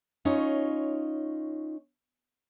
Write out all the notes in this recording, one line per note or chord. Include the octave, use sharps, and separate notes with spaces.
C#4 D#4 F4 C#5